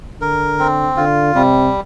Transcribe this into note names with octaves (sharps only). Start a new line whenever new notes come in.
D3 A#4
C4
D3 F4
C3 G3